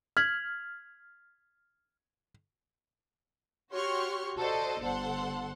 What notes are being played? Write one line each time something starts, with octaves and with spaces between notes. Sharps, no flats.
F6 G#6 B6 F#7
F#4 G4 C#5 C6 C#6 F6
F#4 A4 C5 D5 D#5
G1 A4 C5 F#5 C6